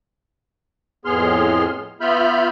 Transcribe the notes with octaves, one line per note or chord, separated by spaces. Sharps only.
F2 A2 B3 G#4 C6 F6
B3 F4 E5 B5 F6 G6